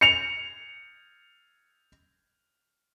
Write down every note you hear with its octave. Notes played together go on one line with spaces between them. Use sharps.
C#7 F7